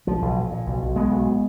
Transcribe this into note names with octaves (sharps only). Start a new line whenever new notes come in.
B1 F3
B1
A#2
A#2
B1
B1
B1 G#3 B3
B1
A#2